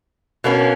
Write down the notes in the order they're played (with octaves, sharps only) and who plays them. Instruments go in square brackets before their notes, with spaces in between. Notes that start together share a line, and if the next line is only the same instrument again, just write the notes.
[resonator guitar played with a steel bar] B2 A#3 C#4